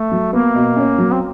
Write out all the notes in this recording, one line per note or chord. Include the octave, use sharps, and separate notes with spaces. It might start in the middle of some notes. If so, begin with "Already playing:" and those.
Already playing: A3
F#3
A#3 B3
B2
C#4
F#3
C4